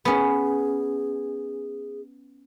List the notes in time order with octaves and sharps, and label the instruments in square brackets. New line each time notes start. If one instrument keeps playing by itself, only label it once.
[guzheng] B3 C#4 [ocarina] G#4